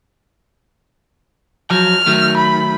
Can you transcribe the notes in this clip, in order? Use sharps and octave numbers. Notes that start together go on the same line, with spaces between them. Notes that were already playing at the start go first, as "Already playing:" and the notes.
F3 F#3 F6
D#3 F#3 A3
B5